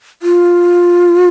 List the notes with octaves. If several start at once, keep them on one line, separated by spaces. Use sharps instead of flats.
F4